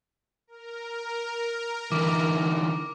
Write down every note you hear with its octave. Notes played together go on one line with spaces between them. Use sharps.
A#4
D3 E3 D6